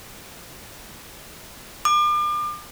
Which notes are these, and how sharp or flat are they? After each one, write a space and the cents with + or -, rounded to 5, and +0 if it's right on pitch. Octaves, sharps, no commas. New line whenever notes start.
D6 +40